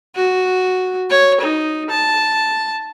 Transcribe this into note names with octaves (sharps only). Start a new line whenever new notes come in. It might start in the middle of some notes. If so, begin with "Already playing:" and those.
F#4
C#5
D#4
A5